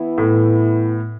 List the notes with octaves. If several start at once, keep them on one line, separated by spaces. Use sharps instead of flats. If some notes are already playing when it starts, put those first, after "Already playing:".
Already playing: E3 B3 E4
A2